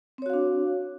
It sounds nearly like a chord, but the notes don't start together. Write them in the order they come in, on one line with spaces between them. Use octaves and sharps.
C4 C#5 F#4 F5 D4